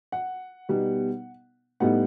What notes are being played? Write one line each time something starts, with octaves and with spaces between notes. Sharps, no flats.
F#5
B2 G3 B3 D#4
A2 G3 B3 D#4 F#5